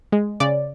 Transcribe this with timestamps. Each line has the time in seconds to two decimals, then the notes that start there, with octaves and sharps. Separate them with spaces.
0.12 G#3
0.40 C#3 D5